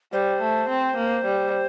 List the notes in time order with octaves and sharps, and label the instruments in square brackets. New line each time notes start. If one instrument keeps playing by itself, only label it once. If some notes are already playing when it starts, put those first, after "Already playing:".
[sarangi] G3 [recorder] C5
[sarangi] A3
C4
A#3
G3